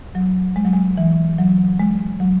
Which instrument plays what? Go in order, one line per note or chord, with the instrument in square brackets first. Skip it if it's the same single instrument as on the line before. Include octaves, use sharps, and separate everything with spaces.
[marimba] F#3
G#3
F#3
G#3
E3
F#3
G#3
F#3